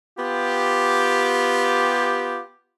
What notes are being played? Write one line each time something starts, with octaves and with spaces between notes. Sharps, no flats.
B3 F4 G4